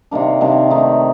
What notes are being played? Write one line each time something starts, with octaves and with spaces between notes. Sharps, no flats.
C3 D#3 A#3 D4
C3 D#3 A#3 D4
D#3 A3 D#4 G4